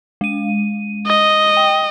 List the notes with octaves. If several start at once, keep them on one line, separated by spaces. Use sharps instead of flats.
G#3 D#7
D#5
G5